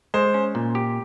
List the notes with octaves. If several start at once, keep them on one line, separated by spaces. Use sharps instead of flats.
G#3 C5
C#4
A#2
G4